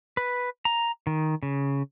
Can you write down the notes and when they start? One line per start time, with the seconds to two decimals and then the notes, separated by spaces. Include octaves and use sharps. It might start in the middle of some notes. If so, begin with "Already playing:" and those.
0.17 B4
0.65 A#5
1.07 D#3
1.43 C#3